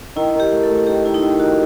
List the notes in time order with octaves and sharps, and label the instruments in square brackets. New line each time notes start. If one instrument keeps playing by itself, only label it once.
[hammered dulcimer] D#3 [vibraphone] E4
[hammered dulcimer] D#3
[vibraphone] G4
[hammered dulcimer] A3
[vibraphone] A4
[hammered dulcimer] A3
[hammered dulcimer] D#3 [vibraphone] G4
[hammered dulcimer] D#3 [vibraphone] E4
[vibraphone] D#4
[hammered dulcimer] D#3 [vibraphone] E4
[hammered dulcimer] D#3 [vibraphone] F#4